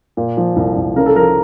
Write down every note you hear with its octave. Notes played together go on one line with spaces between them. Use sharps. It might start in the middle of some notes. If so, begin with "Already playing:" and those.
A#2
F3
C2
C2
C#3 A#4
A4
F3 A#4